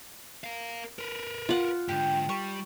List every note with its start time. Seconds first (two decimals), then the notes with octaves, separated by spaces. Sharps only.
0.44 A#4 F5
0.99 A#4 B4
1.49 F4 F#5
1.89 G#2 D3 G4
2.29 G3 C#6